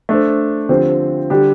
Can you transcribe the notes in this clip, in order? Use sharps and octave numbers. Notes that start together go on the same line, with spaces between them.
A3 D4 A4 C5
D3 F3 C4 G4 C5
D3 G3 D4 G4